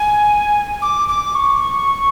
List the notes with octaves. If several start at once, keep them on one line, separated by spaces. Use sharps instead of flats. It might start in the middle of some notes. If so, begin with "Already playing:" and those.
Already playing: G#5
D6
D6
C#6